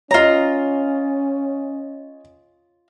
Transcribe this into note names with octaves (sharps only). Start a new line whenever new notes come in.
C#4 F4 C#5 D#5 A#5